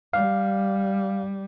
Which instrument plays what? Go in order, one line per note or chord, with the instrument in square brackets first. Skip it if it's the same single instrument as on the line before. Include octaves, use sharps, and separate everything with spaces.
[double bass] G3 [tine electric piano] F5